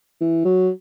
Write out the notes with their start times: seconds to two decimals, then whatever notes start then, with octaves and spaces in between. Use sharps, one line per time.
0.21 E3
0.45 F#3